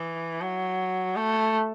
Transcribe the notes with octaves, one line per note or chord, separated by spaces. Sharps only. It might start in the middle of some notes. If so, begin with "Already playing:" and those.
Already playing: E3
F#3
A3